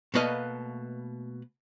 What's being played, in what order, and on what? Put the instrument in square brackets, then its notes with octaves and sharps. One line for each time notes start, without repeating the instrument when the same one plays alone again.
[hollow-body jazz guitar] B2 A3 A#3 B4 D#5 F5